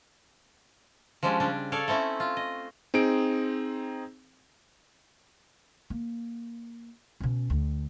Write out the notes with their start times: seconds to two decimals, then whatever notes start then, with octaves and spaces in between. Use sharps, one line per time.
1.23 F3 G3 G#3 C#4 D4
1.40 C#3 G3 D4
1.72 A4 C#5 D5 F5
1.88 A3 C4 C#4 E4
2.20 F4
2.37 D#5
2.94 C4 D#4 G#4 D7
5.90 A#3
7.20 B2 C#4
7.50 D2